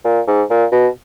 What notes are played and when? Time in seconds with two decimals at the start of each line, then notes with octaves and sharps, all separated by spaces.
0.05 A#2
0.27 G#2
0.50 A#2
0.72 B2